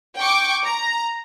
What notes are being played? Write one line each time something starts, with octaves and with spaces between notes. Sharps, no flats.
G5 C#6 D6
A#5